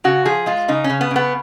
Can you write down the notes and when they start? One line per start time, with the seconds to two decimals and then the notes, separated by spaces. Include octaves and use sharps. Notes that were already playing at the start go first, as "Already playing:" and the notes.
0.04 C#3 F#4
0.25 F3 G#4
0.46 G#3 F4
0.68 C#3 D#4
0.84 C#4
0.89 C#3
1.01 B3
1.11 C#3
1.16 B3